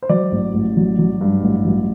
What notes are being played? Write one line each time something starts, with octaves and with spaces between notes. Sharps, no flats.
C5
F#3 D5
A1
A1
F#3
F#3
G2
A1
F#3